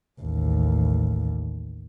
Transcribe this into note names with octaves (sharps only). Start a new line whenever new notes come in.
A1 D#2